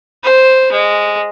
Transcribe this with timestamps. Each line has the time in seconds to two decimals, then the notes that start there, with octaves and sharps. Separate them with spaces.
0.23 C5
0.72 G#3